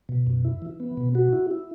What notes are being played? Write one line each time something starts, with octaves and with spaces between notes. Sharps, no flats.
B2
F#2
E4
E3
B3
B2
F#4
E4
E4